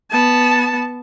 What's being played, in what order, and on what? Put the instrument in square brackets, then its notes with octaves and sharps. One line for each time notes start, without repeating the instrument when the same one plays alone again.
[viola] B3 A5